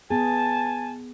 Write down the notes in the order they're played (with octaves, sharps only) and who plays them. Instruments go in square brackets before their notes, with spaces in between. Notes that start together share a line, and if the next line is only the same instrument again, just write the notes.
[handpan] B3 G#4 [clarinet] G#5 [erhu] A5